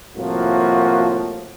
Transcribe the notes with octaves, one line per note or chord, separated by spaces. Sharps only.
C2 A2 F3 A#3 F#4